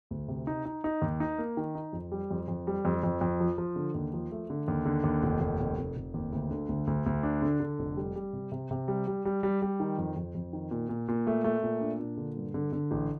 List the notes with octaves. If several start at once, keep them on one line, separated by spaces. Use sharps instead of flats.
D2
C3
D#4
D#4
D#4
D#2
D#4
A#3
D#3
D#4
F2
G3
F2
F2
G3
F2
F2
F2
F3
F3
D3
D#2
F3
A3
D3
D#2
D3
D#2
F1
D#2
F1
F1
F1
D#2
D2
D3
D2
D2
D2
D4
D3
D3
F1
G3
G3
C3
C3
C3
G3
G3
G3
G3
G3
D#3
F2
F2
F2
D#3
A#2
A#2
A#2
A3
A3
A#2
D4
A#2
D3
G2
D3
D3
A1